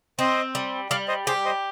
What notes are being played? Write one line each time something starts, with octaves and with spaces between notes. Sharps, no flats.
C4 C5 D#5
G3
G3 D5 F5
C5 D#5
G4 G#4 C5
C5 D#5